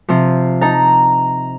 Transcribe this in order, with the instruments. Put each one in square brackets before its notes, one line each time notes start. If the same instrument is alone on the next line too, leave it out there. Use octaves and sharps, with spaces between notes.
[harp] C3 F3
[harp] D#4 A5 [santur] A#5